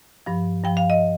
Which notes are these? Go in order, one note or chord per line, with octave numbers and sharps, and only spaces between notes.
G2 F3
G2 F3 G5
F5
D#5